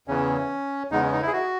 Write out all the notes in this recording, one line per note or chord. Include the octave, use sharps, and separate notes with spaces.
E2 C#3 E3 C#4
E2 C#3 G#3 B3 D#4
C#4
D#4
E4
G#4
F#4